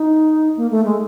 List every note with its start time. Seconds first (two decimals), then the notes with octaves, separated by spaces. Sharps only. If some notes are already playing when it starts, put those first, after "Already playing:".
Already playing: D#4
0.57 A#3
0.71 A3
0.85 G#3